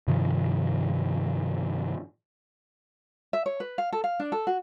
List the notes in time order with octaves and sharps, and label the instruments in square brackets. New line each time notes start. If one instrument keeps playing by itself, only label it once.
[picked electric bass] G2 C3 D#3 F3
[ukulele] E5
C#5
B4
F5
A4
F5
D4
A4
F#4